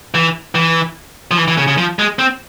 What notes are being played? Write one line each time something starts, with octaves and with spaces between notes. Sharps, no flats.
E3
E3
F3
E3
E3
C#3
C#3
F3
G#3
C4